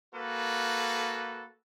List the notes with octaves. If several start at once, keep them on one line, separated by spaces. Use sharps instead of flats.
A#3 F#4 A4 B4